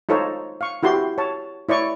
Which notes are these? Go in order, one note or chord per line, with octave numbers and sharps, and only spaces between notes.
D#4 F4 A4 C5 C#5
F5 C#6
E4 F#4 G4 C6
C#5 A5
E4 C#5 D5 C#6